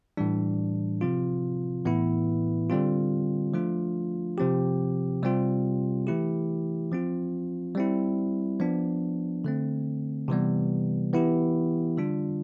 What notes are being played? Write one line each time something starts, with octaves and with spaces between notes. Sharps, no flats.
A2 E3 G3 D4
C3 F3 C4 F4
A2 E3 B3 E4
D3 G3 C4 F4
F3 A3 D4 F4
C3 F3 C4 G4
C3 G3 C4 F4
E3 A3 E4 G4
F3 C4 F4
G3 C4 E4
F3 B3 D4
D3 A3 C4
C3 E3 G3 B3
E3 B3 E4 G4
D3 G3 D4 F4